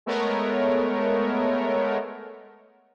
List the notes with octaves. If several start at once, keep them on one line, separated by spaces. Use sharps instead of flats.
G#3 A3 B3 A#4 C#5